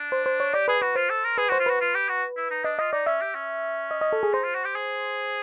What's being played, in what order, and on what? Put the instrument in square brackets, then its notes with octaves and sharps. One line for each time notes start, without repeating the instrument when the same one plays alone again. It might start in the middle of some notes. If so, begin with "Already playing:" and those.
Already playing: [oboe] D4
[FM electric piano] C5
C5
C#5
[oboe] G4 [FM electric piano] D5
[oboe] G#4 [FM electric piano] B4
[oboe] F#4 [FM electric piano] B4
[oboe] F4 [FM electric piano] C5
[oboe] A4
A#4
[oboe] G#4 [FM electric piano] B4
[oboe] F#4 [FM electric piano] C5
[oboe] F4
[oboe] F#4 [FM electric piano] B4
[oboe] F4
G4
F#4
E4
D#4
[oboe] D4 [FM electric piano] D#5
[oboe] F4 [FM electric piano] D#5
[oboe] D#4 [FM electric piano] D5
[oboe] C#4 [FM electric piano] E5
[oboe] G4
C#4
[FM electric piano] D#5
D#5
A4
G#4
[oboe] D#4 [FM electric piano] C5
[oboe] F4
F#4
G4
G#4